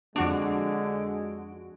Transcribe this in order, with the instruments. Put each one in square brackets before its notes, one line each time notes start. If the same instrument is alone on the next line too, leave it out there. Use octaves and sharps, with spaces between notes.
[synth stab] F2 F#4 D7 [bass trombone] D3 [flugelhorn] G#3 [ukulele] D4